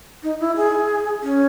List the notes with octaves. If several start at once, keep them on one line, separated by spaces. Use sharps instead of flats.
D#4
E4
G#4
C#4